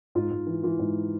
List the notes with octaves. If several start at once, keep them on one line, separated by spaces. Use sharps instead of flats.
G#2 F4
G#2
E3
E3 F4
G#2